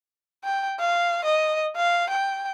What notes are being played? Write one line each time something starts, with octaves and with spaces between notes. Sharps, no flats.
G5
F5
D#5
F5
G5